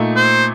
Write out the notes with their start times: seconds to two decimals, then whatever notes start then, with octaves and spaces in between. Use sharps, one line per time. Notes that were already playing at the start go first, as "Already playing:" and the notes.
Already playing: A#2 A3 D#4
0.16 C5